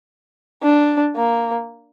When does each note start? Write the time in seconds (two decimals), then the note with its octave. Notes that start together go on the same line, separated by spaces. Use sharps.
0.63 D4
1.16 A#3